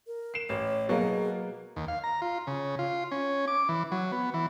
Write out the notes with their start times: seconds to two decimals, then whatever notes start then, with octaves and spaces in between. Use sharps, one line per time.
0.07 A#4
0.34 C7 E7
0.49 A1 C#5
0.89 B2 F#3 A#3 B3 G#4
1.76 D#2
1.88 F5
2.04 A#5
2.22 F4
2.47 C#3
2.79 F4
3.11 C#4
3.48 D6
3.69 E3
3.92 F#3
4.12 B3
4.34 E3